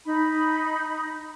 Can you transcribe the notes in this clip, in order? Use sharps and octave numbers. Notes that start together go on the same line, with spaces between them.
D#4 B5